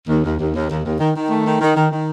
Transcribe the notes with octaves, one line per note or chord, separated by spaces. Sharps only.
D#2
D#2
D#2
D#2
D#2
D#2
D#3
D#3
A3
D#3
D#3
D#3
D#3